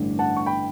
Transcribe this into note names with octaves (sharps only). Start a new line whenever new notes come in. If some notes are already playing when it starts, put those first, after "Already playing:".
Already playing: A1 G2 D3
F#5 A5
C#6
G5 B5